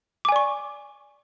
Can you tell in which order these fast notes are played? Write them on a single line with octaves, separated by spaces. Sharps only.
D6 G#5 D5 C#6